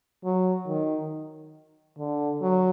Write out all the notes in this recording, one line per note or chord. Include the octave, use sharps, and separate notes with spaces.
F#3
D#3
D3
F#3